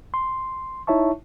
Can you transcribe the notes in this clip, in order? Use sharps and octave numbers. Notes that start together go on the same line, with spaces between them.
C6
D#4 E4 C#5 E5 A5 C#6